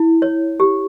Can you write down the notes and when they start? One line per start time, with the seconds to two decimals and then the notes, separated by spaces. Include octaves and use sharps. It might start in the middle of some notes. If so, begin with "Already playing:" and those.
Already playing: E4
0.22 C#5
0.60 G4